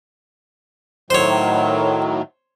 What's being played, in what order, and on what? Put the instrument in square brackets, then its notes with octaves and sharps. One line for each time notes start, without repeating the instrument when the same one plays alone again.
[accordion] A2 D#3 F#3 [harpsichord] C5 C#5